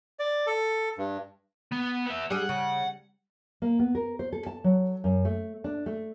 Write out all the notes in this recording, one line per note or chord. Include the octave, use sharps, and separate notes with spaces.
D5
A4
G2
B3
B3 E5
G3 D4 G#4 F#5
C#3
A#3
B3
A#4
C5
A4
A5
F#3
F#2
A3
D4
A3